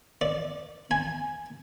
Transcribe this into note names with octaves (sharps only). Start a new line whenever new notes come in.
D5
G#5